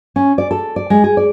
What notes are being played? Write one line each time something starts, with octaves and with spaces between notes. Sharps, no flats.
C#4
D5
A4
D5
G#3
G#4
D5